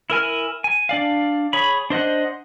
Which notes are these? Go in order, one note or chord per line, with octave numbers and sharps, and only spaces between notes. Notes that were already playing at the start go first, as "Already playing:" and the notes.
E4 A#4 G#5 F6
G#5
D4 D5 F5
G#4 C#5 B5
D4 C5 D#5 F#5